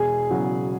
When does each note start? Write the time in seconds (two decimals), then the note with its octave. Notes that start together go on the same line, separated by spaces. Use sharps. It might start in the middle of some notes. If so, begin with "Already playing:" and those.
Already playing: E1 G#4
0.30 E2 C#3 F#3